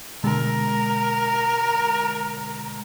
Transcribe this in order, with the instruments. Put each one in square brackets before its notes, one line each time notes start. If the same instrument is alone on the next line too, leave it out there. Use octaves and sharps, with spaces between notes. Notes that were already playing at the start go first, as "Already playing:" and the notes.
[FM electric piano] B2 D3 G#3 [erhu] A#4